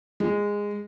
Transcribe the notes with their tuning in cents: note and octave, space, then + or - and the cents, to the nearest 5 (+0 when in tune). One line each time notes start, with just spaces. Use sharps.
G#3 -15